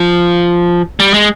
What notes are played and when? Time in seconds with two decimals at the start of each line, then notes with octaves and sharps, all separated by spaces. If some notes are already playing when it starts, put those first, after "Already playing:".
Already playing: F3
1.00 G3
1.14 G#3